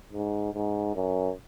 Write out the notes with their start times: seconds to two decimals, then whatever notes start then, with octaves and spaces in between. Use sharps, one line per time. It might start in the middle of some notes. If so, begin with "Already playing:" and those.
0.13 G#2
0.54 G#2
0.95 F#2